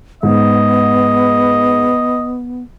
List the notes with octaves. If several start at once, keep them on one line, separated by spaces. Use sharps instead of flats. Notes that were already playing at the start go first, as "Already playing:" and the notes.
G#2 B3 D#5